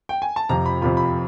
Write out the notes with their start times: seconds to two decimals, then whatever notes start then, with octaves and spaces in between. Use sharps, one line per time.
0.09 G5
0.22 G#5
0.36 A5
0.49 F2 C3 F3 A#5
0.66 B5
0.81 F2 C3 F3 B5
0.97 B5